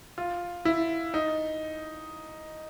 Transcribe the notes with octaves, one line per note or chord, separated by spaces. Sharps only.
F4
E4
D#4